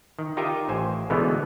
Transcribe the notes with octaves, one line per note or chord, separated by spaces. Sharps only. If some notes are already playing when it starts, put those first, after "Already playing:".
D#3
D#4 F4 G4 A#4 D#5 E5
A1 C5 G#5
B2 D3 E3 G#3 A3 B3